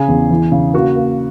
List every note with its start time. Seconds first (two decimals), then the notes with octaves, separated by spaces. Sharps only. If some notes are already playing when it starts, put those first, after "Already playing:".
Already playing: C#3 G#4
0.08 E2
0.31 E3
0.52 C#3
0.74 A#3 F#4
0.96 A#3